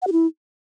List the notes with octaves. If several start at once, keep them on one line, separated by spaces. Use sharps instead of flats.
F#5
G4
E4